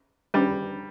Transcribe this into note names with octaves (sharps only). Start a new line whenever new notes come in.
G3